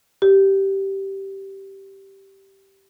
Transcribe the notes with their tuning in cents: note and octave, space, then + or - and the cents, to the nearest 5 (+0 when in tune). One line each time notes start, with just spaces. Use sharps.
G4 -10